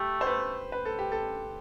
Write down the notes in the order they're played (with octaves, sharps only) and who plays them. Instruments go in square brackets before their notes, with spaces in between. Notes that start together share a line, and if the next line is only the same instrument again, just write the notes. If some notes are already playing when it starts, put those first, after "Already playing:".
Already playing: [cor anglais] A3 [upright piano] G4
[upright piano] C5
B4
B4
A4
G4
A4